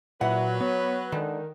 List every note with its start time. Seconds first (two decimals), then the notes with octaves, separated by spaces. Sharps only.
0.21 A#2 F#3 E4 B4 F#5
0.61 B3 C#5
1.12 D3 D#3 G#3